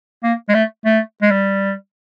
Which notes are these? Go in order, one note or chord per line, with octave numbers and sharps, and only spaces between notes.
A#3
G#3
A3
A3
G#3
G3